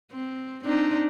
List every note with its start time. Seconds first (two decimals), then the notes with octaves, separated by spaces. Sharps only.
0.12 C4
0.64 C4 D4 D#4